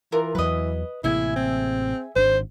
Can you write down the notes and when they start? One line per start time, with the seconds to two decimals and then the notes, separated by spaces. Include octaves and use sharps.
0.12 E3 F4 A#4
0.35 E2 F#3 B4 D#5
1.04 A1 C3 A#3 E4 G#4 E5
1.36 C4
2.16 G#1 D4 C5